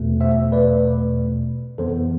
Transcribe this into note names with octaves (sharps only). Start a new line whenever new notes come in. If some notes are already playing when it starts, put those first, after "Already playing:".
Already playing: E2 B2 A3
C5 E5
B4 D5
F2 E3 B3 A4 C5